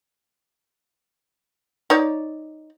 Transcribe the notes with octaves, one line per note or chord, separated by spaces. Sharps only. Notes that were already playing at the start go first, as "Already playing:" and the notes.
D#4 C#5 D5